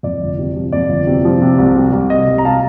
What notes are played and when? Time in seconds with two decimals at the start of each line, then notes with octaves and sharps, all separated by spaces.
0.03 F2 D5
0.20 G1
0.39 C3
0.56 F3
0.72 F2 D5
0.89 G1
1.07 C3
1.25 F3
1.42 C3
1.58 C2
1.76 G3
1.93 C2
2.10 C3 D#5
2.28 C2
2.38 A#5
2.45 G3 F5 A5